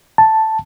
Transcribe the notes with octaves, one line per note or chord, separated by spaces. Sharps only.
A5